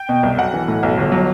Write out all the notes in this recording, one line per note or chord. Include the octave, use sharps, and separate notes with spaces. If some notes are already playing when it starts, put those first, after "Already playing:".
Already playing: G5
B2
C2
B1 F#5
E3
A2
B1
G1
F#3